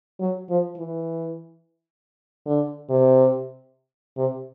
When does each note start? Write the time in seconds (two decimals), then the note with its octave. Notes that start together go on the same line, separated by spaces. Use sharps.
0.20 F#3
0.49 F3
0.77 E3
2.46 D3
2.89 C3
4.17 C3